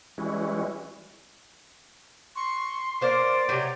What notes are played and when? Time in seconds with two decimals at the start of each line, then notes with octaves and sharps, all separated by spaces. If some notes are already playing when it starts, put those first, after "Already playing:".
0.18 E3 G3 G#3 C#4 E4 F#4
2.36 C6 C#6
3.01 A#3 C5 D5 F5
3.49 C3 F#3 G6